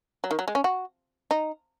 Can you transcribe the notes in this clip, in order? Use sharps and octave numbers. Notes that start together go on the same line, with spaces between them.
F#3
D#3
F#3
G#3
C#4
F#4
D#4